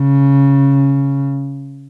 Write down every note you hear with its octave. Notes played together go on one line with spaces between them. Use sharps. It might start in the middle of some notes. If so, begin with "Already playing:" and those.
Already playing: C#3